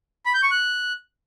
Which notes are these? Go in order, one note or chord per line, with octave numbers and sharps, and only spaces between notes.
B5
G6
C#6
F#6